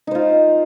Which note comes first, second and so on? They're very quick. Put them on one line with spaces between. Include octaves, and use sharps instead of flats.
D#4 C5 F4